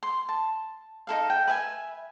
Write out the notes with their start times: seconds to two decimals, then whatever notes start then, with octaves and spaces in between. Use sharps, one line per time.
0.03 C6
0.29 A5
1.07 D#4 E4 A4 F5
1.30 G5
1.47 B4 E5 F5 G#5